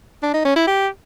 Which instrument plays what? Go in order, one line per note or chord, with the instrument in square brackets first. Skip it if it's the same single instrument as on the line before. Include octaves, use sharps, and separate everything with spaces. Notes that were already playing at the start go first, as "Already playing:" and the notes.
[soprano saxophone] D4
D#4
C#4
E4
G4